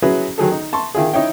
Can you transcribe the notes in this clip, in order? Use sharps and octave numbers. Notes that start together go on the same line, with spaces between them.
F#3 C#4 E4 F#4 G#4 B4
D#3 F#3 G#4 A4
D#4
A5 C6 C#6
D#3 E4 F4 G#4
D#4 E4 C#5 G5